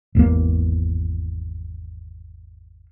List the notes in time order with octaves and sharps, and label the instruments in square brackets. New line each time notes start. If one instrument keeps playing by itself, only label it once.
[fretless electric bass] G#1 E2 E3 A#3